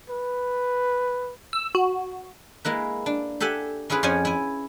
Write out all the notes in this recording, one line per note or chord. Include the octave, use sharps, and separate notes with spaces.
B4
E6
F#4
G#3 A#3 E4 B4
D4
G4 A4 E5 F#5 G#5
C#4 E4 F4 G#4 B4
F2 F3 C#4 C#5 G#5
E4 G#5